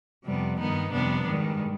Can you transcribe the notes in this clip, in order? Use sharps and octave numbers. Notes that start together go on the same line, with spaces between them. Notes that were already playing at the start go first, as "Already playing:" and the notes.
F2 C3 G3 B3
G2 D#3 B3 D#4
F2 C3 G3 B3 D4
G#2 D#3 G3